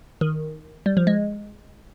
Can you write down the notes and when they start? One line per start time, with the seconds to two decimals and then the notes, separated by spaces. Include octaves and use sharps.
0.21 D#3
0.86 G3
0.97 F3
1.07 G#3